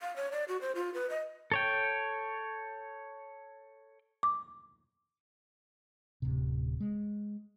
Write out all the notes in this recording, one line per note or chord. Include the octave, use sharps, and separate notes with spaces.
F5
C#5
D5
F#4
C5
F4
B4
D#5
A4 C#5 G5
D6
D1 C3
G#3